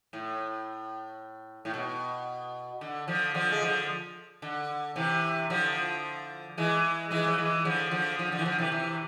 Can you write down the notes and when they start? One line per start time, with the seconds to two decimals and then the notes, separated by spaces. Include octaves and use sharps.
0.13 A2
1.65 A2
1.74 B2
2.81 D3
3.08 D3 F3
3.34 D3 F3
3.51 G#3
3.62 D3 F3
4.42 D3
4.96 C3 E3
5.50 D3 F3
6.58 E3 G#3
7.11 E3 G#3
7.27 F3
7.38 E3 G#3
7.65 D3 F3
7.91 D3 F3
8.18 D3 F3
8.32 D3 F3
8.39 E3
8.45 D3 F3
8.59 C3 E3
8.72 C3 E3